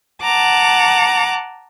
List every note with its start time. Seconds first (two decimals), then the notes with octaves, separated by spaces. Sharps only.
0.22 F#5 A5 A#5 D6